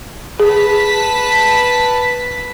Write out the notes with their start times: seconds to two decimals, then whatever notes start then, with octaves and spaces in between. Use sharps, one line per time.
0.40 G#4 B4 A5 B6